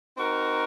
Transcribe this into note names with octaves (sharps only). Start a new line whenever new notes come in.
C4 D#4 F#4 A#4